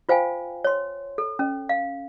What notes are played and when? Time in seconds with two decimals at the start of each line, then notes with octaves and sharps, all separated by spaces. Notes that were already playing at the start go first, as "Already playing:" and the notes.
0.09 F4 C5 F5 G5 G#5
0.64 C#5 C6
1.18 A4
1.39 C#4
1.69 F5